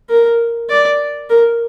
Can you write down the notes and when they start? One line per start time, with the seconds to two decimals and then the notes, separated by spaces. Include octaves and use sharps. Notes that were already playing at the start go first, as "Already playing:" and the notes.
0.09 A#4
0.69 D5
1.30 A#4